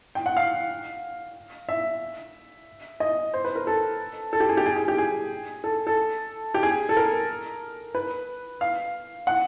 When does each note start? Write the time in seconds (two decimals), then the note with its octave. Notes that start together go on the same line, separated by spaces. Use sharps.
0.15 G5
0.26 F#5
0.37 F5
1.69 E5
3.00 D#5
3.34 C5
3.45 B4
3.56 A#4
3.67 A4
4.33 A4
4.40 G4
4.49 G#4
4.57 G4
4.66 G#4
4.76 G#4
4.88 G4
4.98 G#4
5.64 A4
5.87 A4
6.54 G4
6.63 G#4
6.89 A4
6.97 A#4
7.95 B4
8.61 F5
9.27 F#5